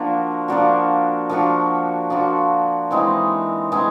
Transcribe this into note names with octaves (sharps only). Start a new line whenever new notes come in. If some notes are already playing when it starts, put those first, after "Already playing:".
Already playing: F3 A#3 D4 F#4
F3 A#3 D4 F#4
F3 A#3 D4 F#4
F3 A#3 D4 F#4
E3 G#3 C4 D#4
E3 G#3 C4 D#4